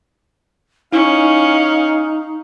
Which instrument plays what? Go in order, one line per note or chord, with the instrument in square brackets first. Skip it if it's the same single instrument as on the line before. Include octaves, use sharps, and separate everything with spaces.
[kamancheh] C#4 [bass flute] D#4 [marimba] E4 [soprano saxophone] F5